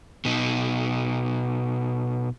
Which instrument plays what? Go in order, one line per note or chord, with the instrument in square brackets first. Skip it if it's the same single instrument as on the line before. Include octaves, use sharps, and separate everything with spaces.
[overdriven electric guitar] B2 D#4